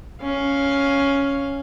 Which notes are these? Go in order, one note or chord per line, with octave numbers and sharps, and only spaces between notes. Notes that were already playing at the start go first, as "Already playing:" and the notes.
C#4 F5